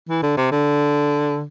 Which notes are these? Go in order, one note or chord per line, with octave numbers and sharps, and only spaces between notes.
E3
D3
C3
D3